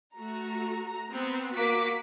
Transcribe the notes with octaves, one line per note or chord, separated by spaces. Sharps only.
A3 F#4 A#5
B3 C4
A#3 F#4 D6 B6